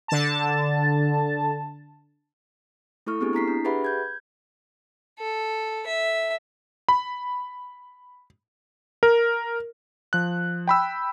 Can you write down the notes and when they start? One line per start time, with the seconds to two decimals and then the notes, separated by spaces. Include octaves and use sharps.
0.08 D3 A5
3.07 A3 E4 A4 C#6 F6
3.21 B3 C4 D4 G4 G#4
3.33 E4 A#5 B6 C7
3.48 D4
3.65 G4 G#4 B4 E5 F#5 B5
3.85 G6 G#6
5.19 A4
5.87 E5
6.89 B5
9.03 A#4
10.13 F3 F#6
10.68 G5 B5 E6